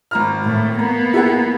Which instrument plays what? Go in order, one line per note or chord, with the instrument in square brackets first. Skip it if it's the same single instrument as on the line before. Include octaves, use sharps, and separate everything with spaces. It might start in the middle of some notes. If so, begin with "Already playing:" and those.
[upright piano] G#1 A#5 F6
[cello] A2 A3
[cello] A#3 B3 [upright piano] A#5
[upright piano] E4 G#4 F#5